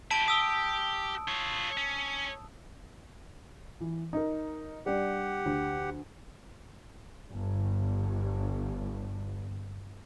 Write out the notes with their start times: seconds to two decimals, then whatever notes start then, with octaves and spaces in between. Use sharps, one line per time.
0.11 E4 G4 A5 D7
0.28 G4 D#6 E6
1.28 F4 C#5
1.78 C#4
3.81 E3
4.13 D#4 A#4
4.86 G3 D4 G4 F#5
5.46 D2
7.27 G1 G2